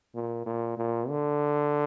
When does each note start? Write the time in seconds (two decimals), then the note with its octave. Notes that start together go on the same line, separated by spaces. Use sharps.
0.15 A#2
0.46 A#2
0.78 A#2
1.09 D3